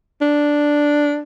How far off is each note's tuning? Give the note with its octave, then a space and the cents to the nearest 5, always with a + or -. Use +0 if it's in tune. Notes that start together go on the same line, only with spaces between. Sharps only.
D4 +0